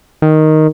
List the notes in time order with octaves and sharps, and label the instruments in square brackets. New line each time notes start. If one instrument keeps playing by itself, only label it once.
[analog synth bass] D#3